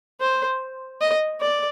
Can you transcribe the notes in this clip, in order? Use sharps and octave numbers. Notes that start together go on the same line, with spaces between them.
C5
D#5
D5